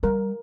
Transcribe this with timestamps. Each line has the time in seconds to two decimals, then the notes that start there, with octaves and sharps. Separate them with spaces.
0.03 G3 A#4